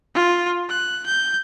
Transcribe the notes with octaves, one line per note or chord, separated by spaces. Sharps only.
F4
F#6
G6